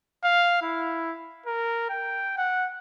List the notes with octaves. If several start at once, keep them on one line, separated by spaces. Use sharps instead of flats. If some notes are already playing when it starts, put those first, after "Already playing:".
F5
E4
A#4
G5
F#5